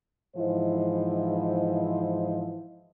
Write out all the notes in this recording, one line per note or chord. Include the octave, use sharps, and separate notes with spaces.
G#2 E3 F3 E4 C5 D#5